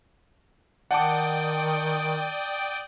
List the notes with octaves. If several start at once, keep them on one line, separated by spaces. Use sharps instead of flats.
D#3 D5 F#5 G5 A5 D6 D#6